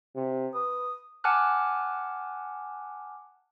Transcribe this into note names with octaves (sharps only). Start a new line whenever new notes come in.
C3
B4 D#6
F#5 G#5 A5 D6 F6 F#6